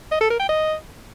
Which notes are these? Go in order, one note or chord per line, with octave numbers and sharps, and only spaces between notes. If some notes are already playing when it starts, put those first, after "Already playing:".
D#5
A4
A#4
G5
D#5